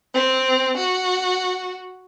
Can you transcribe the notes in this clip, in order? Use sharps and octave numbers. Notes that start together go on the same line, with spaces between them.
C4
F#4